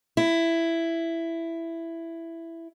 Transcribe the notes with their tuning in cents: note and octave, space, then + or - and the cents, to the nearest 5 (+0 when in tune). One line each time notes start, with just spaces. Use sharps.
E4 +10